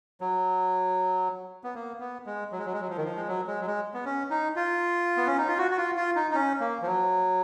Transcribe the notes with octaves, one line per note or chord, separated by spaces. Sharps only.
F#3
B3
A#3
B3
G#3
F#3
G#3
F#3
G#3
F#3
F3
D#3
F3
G#3
F#3
G#3
F#3
G#3
B3
C#4
D#4
F4
B3
C#4
D#4
F4
F#4
F#4
F4
F4
D#4
D#4
C#4
A#3
F3
F#3